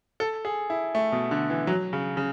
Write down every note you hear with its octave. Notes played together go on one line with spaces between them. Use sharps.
A4
G#4
E4
A3
B2
D3
E3
F#3
C#3
C#3